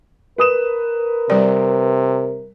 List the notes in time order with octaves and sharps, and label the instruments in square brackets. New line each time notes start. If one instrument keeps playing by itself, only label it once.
[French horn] A#4 [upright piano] B4 D#6 E7
[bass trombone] C3 [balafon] G3 D5